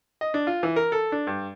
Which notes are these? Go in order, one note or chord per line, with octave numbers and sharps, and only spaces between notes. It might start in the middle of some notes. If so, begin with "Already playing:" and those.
D#5
D4
F4
E3
A#4
A4
D4
G2